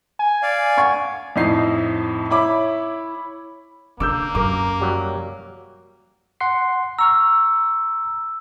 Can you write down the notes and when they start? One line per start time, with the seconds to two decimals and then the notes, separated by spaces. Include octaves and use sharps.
0.19 G#5
0.43 D5 F5
0.77 F#5 C#6 G#6
1.36 F2 A2 D#4 C7
2.30 E4 C#5 B5 D6
4.00 D3 A#3 D6 E6 G6
4.35 F#2 A#4 D6
4.81 F#3 G3 G4
6.40 F#5 C6 C7
6.98 A#5 C#6 E6 F6